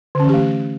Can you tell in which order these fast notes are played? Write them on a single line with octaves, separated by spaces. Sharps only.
D3 C#4 E3 G4 A3